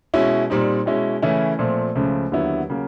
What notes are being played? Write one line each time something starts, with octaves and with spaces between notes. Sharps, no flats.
B2 G#3 C#4 E4
A#2 G3 C4 D#4
B2 G#3 C#4 E4
C#3 E3 A3 C#4 E4
A#2 F3 A3 C4
C#2 C#3 F3 A3
D#2 D3 F#3 B3 E4
C#3 F#3 A#3